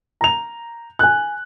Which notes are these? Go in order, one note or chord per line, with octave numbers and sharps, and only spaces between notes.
A#5 F7
G#5 F#6